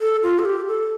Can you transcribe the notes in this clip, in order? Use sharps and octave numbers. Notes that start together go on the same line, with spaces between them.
A4
F4
A4
G4
A4